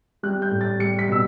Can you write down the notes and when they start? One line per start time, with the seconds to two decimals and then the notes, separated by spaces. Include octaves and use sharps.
0.23 G3 F#6
0.42 G6
0.51 A2
0.61 A6
0.79 G3 C#7
0.99 B6
1.09 B2 E6